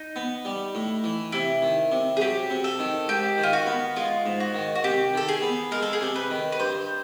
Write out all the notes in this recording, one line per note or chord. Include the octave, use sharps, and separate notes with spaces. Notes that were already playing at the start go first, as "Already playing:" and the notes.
Already playing: D#4
B3
G3
A2
E3
C3 E4
D#3
C3
G#4
F#3 G4
C3
A4
D#3
G#2 G4
D#3
F4
F#4
B3
G#3 F4
G#2
F#4
D#3
F#4
C3 G4
D#3 A4
G#4
B3
G#3 A#4
A4
G#4
C3 A4
B4
D#3
B4
G2 C5